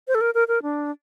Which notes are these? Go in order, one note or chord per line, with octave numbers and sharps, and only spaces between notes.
C5
A4
A#4
A#4
A#4
D4